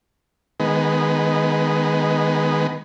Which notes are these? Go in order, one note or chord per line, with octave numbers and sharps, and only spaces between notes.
D#3 G#3 B3